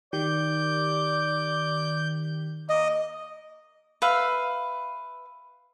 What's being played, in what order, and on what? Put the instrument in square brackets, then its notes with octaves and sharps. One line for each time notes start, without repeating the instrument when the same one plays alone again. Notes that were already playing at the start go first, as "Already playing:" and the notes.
[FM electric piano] D#3 G4 [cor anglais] D5 [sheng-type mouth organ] G6
[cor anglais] A#3 [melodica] D#5
[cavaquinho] B4 E5 F5